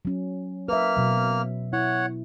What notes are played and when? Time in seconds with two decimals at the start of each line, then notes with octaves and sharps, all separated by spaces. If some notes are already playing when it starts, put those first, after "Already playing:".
0.05 F#3 C#4
0.68 A#3 B4 E5 F6
0.97 B2 F#3
1.73 E4 C#5 F#5